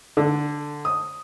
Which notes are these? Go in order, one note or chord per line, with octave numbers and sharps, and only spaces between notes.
D3
D#6